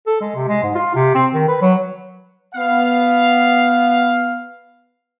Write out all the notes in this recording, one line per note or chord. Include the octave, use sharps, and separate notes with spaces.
A4
G#3
C3
G#3
G#2
F4
C3
C4
D#3
B4
F#3
B3 F5